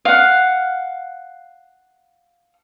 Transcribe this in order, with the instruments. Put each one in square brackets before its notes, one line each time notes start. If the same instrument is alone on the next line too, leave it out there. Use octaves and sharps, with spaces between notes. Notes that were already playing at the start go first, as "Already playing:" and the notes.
[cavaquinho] F5 F#5